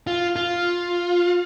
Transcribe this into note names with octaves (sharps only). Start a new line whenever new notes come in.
F4
F4